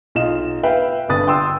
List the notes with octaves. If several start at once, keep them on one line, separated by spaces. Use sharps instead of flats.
B1 F4 D#5 E7
B4 E5 F5 G5
G1 G2 B4 D#6 A6
G5 C6 D#6 E6